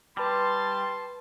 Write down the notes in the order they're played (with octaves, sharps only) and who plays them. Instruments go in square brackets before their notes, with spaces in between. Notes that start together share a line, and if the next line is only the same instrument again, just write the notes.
[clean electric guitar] G3 [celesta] B4 B5 [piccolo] A5 [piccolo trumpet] C6